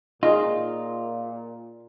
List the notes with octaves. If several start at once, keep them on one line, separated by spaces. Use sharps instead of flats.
A#2 D#4 F4 G#4 D#5